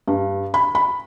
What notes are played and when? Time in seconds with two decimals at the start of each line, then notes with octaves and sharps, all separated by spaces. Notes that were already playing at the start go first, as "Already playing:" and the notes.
0.08 G2
0.54 B5
0.75 B5